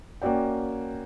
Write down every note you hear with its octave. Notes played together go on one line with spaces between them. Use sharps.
A#3 C#4 F#4 D5 G5